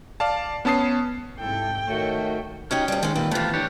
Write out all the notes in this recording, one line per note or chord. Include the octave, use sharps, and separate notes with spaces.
D5 F5 A5
B3 C#4 A5 D#6 C7
G#2 C3 E4 A4 G5
D#3 A3 F#4 C#5
F#3 C#4 D#4 G4 C#5 D#5
D2 G3
D#3 G#3 C#4
A#2 G3 B4
C3 E3 A3 B3 F4
D4 G4 C#5